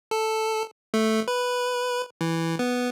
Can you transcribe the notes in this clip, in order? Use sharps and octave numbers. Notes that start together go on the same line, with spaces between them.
A4
A3
B4
E3
B3